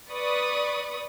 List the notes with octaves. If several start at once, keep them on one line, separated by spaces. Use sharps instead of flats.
B4 D5 B5 C#6 D#6